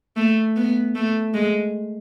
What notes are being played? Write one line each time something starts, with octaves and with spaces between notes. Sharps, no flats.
A3
B3
A3
G#3